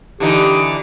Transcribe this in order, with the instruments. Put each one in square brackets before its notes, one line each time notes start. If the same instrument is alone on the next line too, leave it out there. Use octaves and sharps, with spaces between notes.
[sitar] D3 E3 D#4 [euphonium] G4